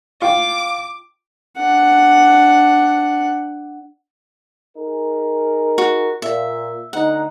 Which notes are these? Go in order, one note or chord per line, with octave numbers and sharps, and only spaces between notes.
F4 F5 G5 D6
D4 F#5
D#4 G#4 A#4
F#4
A#2 E5
D2 D#4 F#5